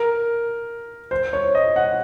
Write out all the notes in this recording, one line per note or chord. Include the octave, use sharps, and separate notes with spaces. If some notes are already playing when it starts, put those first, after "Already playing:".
Already playing: A#4
C5
C#5
D#5
F#5